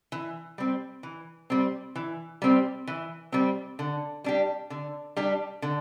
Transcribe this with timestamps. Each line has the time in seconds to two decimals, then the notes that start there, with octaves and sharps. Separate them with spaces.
0.12 E3
0.58 G3 C4
1.03 E3
1.50 G3 C4
1.96 E3
2.42 G3 C4
2.87 E3
3.32 G3 C4
3.79 D3
4.24 G3 D4 G4
4.70 D3
5.16 G3 D4 G4
5.62 D3